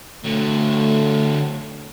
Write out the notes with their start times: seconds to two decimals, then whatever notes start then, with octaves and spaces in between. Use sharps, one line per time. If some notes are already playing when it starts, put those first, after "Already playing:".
0.24 D3 F#3 A3